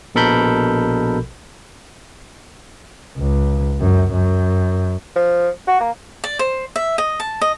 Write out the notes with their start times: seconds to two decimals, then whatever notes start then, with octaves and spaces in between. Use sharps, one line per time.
0.15 A#1 B2 A4 A#4 B5 G6
3.18 C#2
3.81 F#2
4.13 F#2
5.16 F3
5.68 F#4
5.81 A#3
6.24 D5
6.39 C5
6.76 E5
6.98 D#5
7.20 A5
7.41 D#5